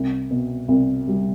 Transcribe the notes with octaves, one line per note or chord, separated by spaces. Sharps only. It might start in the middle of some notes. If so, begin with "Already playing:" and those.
Already playing: C2
B2
C2
G3